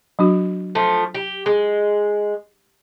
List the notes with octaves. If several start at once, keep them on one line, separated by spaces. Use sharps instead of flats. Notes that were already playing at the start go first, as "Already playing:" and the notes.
F#3 D4 F#4
F3 A3
G4
G#3